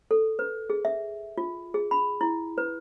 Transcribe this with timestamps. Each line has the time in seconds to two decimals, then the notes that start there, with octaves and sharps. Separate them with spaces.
0.11 A4
0.39 B4
0.70 G#4
0.85 E5
1.38 F4
1.74 G#4
1.91 B5
2.21 E4
2.58 B4